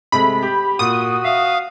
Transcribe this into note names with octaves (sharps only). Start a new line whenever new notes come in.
C3 G#3 A3 B5
G4
A#2 F#4 D#6
E5 F5